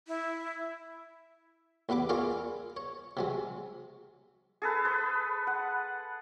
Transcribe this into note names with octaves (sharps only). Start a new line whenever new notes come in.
E4
A1 E2 B3 B4 D6
F4 G#4 A#4 C#5 D5 F5
C#5
C3 F#3 G#3
G#4 A4 B4
B4
F#5